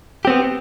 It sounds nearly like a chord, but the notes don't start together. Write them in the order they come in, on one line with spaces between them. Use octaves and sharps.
G4 C4 B3